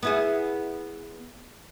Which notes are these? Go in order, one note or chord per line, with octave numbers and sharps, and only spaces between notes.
B3 E4 G#4